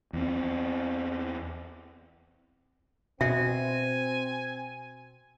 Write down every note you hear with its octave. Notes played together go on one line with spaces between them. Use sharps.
E2 C4
B2 C4 E5 G#5